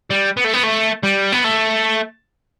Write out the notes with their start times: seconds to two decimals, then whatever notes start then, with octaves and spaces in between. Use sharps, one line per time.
0.10 G3
0.37 B3
0.44 A3
0.54 B3
0.63 A3
1.03 G3
1.32 B3
1.44 A3